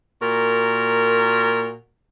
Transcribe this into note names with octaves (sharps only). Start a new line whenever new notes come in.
A#2 F#4 A#4